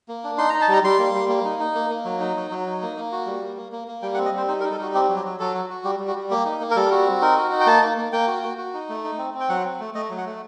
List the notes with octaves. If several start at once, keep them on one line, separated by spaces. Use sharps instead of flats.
A#3
D4
D#4 C6
D#4 A#5
A5
G3 A#5
G3 C6
A#3
G3
A#3
D#4
D#4
A#3
A#3
F#3
D#4
F#3
F#3
D#4
A#3
A#3
F#4
G3
A#3
A#3
A#3
A#3
G3 G5
F#5
C4
D#5
G3 C5
D#4 C5
A#4
D#4
A4
G3 F#4
C4 G4
F#3
G4
F#3
F#3 A4
F#4
F#4
G3 G4
G3
F#4
G3
A#3 G4
D#4
A#3
A#4
G3 A4
F#4
C4
D#4 A#4
F#4
D#4
G5
A#3 A5
A#3
A#3
A#3 G5
F#4
F#4
F#4
D#4
A3
D#4
C4
C4
G5
F#3 F#5
C4
A3
A3 D#5
F#3
F#5
A3